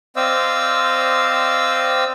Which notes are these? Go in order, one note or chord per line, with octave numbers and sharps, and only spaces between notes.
C4 C5 D5 D#5 F5 E6